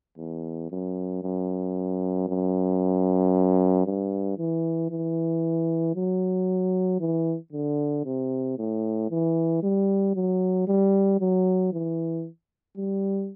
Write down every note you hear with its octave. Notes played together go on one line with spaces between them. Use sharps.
E2
F#2
F#2
F#2
G2
E3
E3
F#3
E3
D3
C3
A2
E3
G3
F#3
G3
F#3
E3
G3